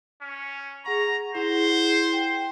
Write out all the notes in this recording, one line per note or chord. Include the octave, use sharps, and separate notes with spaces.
C#4
G#4 F#5 A#5 C#6
E4 G#4 C5 F#5
G5